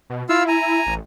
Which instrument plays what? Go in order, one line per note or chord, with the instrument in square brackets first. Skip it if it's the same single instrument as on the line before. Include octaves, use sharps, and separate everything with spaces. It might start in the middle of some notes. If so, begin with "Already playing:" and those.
[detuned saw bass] B2
[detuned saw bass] E4 [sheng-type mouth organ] F4 F5 E6
[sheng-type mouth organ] G#5 A#5
[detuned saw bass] A1